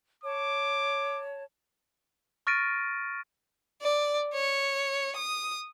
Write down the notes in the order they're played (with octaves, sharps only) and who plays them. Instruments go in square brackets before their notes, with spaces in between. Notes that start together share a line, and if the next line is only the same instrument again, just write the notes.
[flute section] C#5 A5 [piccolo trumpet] D6
[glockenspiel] C#6 F6 A6 A#6 D7 D#7
[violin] D5
C#5
D#6